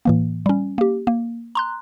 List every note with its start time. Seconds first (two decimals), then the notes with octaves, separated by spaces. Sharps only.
0.05 A2 E3 A#3
0.46 G3 C#4
0.78 A#3 G4
1.07 A#3
1.55 A#5 C6 F#6